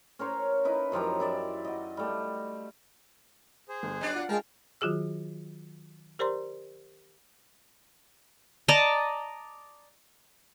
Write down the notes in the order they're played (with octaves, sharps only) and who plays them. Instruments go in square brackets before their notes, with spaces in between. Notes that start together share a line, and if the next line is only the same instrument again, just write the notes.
[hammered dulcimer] C#4 A#4 C5 C#5
D#4 E4 B4
F#2 F3 G4 A#5
E4 D5 E5
F#4 D#5
G3 A3
[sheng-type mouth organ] G#4 C5
[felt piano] G1
[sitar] F#3 D4 D5 [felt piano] D#5 A6
[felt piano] F4 [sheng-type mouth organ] F#5
[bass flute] G#3 [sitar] A#4 [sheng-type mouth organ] F5 G5 A5
[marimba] D#3 F#3 F4 F#4 G#4 E6
G4 A#4 C5 D5 A#5 C6
[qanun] D5 D#5 A5 A#5